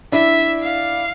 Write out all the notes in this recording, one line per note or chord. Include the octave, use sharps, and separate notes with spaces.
D4 E4 E5
F5